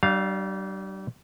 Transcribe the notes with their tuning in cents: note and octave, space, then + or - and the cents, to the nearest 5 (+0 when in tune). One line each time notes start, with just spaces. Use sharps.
G3 -35 D4 +25 F5 +0